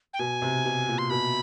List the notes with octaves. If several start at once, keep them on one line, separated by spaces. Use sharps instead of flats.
G5
B2 G#5
C3
B2
A#2
C6
B2 B5